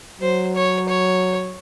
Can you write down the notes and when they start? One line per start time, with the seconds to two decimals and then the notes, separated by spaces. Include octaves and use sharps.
0.21 F#3 C5
0.55 C#5
0.88 C#5